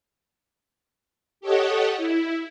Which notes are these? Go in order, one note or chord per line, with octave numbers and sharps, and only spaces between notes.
G4 A4 C#5 D#5 F#5
E4